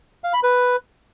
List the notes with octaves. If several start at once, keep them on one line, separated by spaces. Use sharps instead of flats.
F5
B5
B4